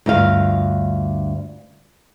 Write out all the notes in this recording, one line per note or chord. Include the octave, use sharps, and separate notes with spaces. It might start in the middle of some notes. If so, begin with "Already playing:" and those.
D2 G2 F4 F5